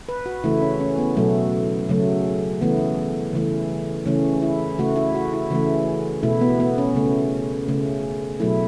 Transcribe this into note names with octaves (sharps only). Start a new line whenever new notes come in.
B4
F#4
C#3 E3 A3 E4
C#4
C#4
B3
B2 F#3 A3
C#3 F#3 A3
C#3 E3 A3 B3
C#3 E3 A3
C#3 E3 A3 C#4
E4
C#3 A3 F#4
E4
F#4
E4
C#3 E3 A3
B2 A3 E4
B3
B3
C#4
C#3 A3
C#3 A3
B2 F#3 A3 E4